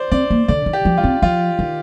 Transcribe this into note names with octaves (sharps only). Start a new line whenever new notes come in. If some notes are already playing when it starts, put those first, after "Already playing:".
Already playing: C5 D5
C4 D5
A#3
D3 D5
D#3
G4
F3
F4
C4
F3 F4
D#3